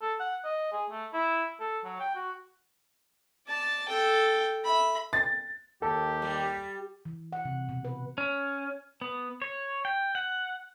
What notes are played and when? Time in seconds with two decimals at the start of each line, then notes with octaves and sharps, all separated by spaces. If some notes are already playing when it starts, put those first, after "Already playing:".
0.01 A4
0.20 F#5
0.45 D#5
0.72 G#4
0.90 A3
1.13 E4
1.60 A4
1.84 F#3
2.00 G5
2.15 F#4
3.47 D5 A5
3.88 A4 G5
4.64 E5 B5
5.13 A6
5.82 D#2 G4 A4
6.22 G3
7.05 E3
7.33 F#5
7.45 C3
7.69 B2
7.85 B4
8.18 C#4
9.01 B3
9.42 C#5
9.85 G5
10.15 F#5